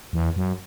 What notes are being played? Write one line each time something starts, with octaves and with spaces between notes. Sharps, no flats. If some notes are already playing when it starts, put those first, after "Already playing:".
E2
F#2